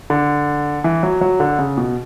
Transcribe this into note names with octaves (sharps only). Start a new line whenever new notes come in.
D3
E3
F#3
F#3
D3
C#3
B2